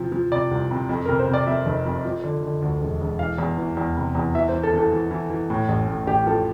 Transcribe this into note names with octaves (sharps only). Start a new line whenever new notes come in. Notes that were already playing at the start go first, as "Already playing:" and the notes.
Already playing: C3 E3 F3
F3
C3 D5
C2
C3
F2
C3 A#4
C5
C3
D5
F2 E5
F1
F2
F3
D3
D3
D2
E1
E1
E3 F5
E2
E3
E2
C3
E2
E3 E5
C5
E3
A4
E3 A4
E3
E3
E3
A2
A1
A2
A1 G4
F3 A4